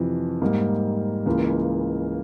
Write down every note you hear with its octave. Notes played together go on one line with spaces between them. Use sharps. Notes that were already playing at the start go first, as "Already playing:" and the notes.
Already playing: F2 C3 E3
G#2 G3 A#3
C#2 C#3 E3 A#3